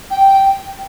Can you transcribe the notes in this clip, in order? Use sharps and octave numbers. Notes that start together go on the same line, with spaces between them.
G5